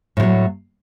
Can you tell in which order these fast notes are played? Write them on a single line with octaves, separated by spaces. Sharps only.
A2 F3 F#3